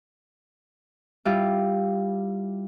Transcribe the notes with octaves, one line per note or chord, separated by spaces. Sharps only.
G3 E4 F4 G4